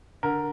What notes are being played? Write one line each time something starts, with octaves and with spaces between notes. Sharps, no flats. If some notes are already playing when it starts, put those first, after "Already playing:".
D3 A#4